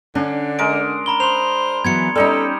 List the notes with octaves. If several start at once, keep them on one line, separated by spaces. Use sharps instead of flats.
D3 C#4 D4
G#3 A#4 D7
A#5 B5 G7
C5 C6 F7
E3 F#3 B3 G#6 C#7
G3 C#4 D#4 A4 D5